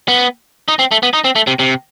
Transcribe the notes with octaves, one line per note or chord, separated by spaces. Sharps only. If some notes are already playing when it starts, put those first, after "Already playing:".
B3
D#4
C4
A3
B3
D#4
C4
A3
C3
C3